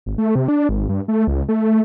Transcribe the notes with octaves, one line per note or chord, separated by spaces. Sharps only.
G#1
A3
C3
D4
G#1
G2
A3
C#2
A3